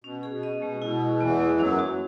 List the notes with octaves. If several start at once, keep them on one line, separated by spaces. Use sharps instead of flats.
B2 C#4
G#4
B2
D#5
B2
G#3
B2 E4
G#4
E2 E3 A#3
A#3
G#3
F#2 F#3 C#4
F#4